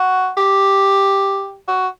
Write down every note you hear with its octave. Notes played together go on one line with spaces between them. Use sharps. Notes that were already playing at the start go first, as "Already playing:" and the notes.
Already playing: F#4
G4
F#4